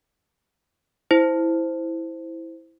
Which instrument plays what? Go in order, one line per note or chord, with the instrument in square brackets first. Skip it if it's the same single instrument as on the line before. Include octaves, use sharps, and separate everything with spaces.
[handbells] E4 C5